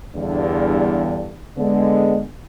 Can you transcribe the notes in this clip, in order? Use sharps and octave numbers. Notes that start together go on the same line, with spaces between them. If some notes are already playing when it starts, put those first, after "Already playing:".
E2 G2 D3
D3 G#3 B3